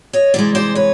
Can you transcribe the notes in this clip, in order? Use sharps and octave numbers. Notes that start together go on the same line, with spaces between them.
C#5 D#5
C3 E3 G#3 D5 E5
C5 D5
B4 C#5